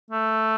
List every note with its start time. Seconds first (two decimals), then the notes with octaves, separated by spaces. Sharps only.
0.10 A3